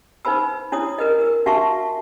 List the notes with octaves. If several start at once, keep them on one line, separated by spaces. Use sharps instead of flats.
D#4 B4 C5 B5 E6
D4 E4 C#5 D#6
A#4 B4 D#5
A#4 E6
D4 F#4 E5 F5 A5 C#6